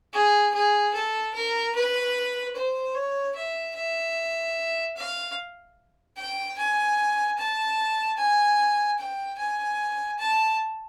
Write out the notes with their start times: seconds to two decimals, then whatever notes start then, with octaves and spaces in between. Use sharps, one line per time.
0.13 G#4
0.54 G#4
0.94 A4
1.34 A#4
1.75 B4
2.55 C5
2.95 C#5
3.35 E5
3.76 E5
4.96 F5
6.16 G5
6.58 G#5
7.38 A5
8.18 G#5
8.98 G5
9.38 G#5
10.19 A5